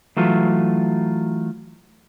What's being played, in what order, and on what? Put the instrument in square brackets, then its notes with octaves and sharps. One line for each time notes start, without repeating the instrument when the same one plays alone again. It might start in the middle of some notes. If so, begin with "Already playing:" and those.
[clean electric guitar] E3 F#3 A3 F4